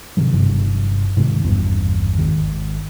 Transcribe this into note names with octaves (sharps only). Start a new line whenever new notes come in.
G#2 C3 D#3 F#3
G1 G2 C3 F3
G#2 C3 D#3
G#1 E2 G2
G#1 D#3